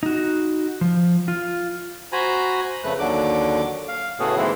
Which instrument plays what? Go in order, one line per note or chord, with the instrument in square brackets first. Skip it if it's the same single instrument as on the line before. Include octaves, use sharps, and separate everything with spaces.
[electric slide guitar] D#4 F#4
F3
F4
[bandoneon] F#4 C5 G#5 A#5 B5
F2 C#3 A3 B4 F#6
D#2 D3 F#3 D6
F5
A2 C#3 A3 B3 F#4 G#4
D#3 E3 G#3 A#3 C4 E4